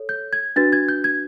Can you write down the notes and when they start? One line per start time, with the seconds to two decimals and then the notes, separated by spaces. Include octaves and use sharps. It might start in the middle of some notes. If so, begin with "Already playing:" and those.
Already playing: A4 C#5
0.09 G6
0.33 G#6
0.56 D4 F#4 B4 A6
0.73 G#6
0.89 G6
1.04 G#6